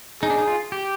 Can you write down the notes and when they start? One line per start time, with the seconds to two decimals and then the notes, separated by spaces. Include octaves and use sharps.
0.23 D#4 G#4
0.30 D4
0.38 D#4
0.47 F4
0.72 G4